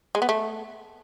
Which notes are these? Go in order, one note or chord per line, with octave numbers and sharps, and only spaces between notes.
G#3
B3
A3